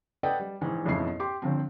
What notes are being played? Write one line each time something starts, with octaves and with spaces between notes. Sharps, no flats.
A4 B4 D5 D#5 F#5 G5
G3
A#1 G#2 E3
A1 F2 G#2 B2 E4 C7
G4 C6 D6
G1 D3 F3 C4